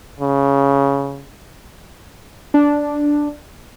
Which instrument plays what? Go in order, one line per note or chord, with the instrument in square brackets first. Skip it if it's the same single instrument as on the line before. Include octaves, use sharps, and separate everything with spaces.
[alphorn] C#3
[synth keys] D4